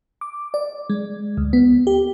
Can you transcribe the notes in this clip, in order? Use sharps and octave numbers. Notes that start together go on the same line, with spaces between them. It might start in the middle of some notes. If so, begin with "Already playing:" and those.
D6
D5
G#3
D2
B3
G4